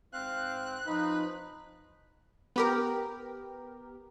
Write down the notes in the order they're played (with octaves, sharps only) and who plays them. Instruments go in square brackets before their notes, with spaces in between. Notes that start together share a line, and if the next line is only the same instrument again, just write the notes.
[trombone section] G#2 C4 [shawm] F5 [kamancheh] F#6
[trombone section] F3 [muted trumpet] D#4 [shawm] B4
[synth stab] B3 G4 A#4